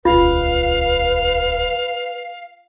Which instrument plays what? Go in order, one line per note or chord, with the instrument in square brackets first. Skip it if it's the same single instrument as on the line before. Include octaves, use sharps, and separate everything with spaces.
[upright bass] D#1 C#2 [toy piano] F4 [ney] B4 [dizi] F5